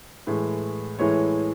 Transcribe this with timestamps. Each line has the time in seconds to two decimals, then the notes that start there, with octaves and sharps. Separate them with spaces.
0.27 A2 E3 G#3
0.99 A2 E3 G#3 C#5